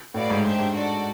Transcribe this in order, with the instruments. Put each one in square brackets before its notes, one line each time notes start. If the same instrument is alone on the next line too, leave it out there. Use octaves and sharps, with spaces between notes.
[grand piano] A2 [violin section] F#4 B4 D5 F5
[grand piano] G#2
[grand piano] G#2 [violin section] D4 G4 C5 E5
[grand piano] G#2
[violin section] F#4 A4 D5